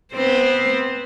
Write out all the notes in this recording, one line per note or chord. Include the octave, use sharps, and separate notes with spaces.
B3 C4 C5